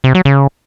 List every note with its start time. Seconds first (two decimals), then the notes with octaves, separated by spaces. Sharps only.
0.04 C3
0.15 F#3
0.25 C#3